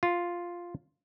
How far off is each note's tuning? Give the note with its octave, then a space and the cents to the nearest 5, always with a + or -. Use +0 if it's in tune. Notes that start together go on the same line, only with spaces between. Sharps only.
F4 +0